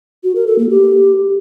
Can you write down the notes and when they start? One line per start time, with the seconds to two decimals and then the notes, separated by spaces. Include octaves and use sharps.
0.24 F#4
0.35 A#4
0.47 A4
0.59 A#3
0.70 G4